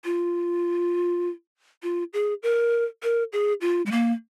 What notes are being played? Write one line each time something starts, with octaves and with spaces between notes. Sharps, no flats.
F4
F4
G#4
A#4
A#4
G#4
F4
G#3
A#3